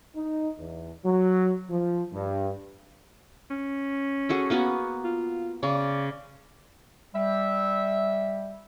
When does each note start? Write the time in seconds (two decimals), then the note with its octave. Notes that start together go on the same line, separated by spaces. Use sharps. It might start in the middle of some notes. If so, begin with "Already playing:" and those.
0.16 D#4
0.59 E2
1.06 F#3
1.70 F3
2.13 G2
3.51 C#4
4.29 F#4 G#4 A4
4.50 A#3 B3 F#4
5.04 F4
5.63 C#3 D5
7.15 G3 E5